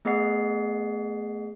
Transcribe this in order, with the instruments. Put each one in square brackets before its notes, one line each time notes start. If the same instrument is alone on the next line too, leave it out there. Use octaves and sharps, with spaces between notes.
[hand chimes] A3 B3 G#4 D#5 F#5 C7